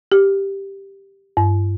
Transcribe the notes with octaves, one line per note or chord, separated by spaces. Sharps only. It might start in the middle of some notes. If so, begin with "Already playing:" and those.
G4
G2